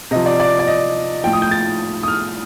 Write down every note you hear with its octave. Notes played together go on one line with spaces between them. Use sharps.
C3 F3 D#5
D5
D5
D5
D#5
A2 F3 G5
D#6
G6
A6
D#6
F6